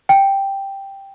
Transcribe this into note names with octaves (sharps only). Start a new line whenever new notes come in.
G5